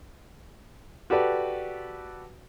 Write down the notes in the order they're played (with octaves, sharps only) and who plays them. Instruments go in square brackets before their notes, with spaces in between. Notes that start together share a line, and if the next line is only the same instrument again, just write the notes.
[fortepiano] F#4 G4 A4 B4 D5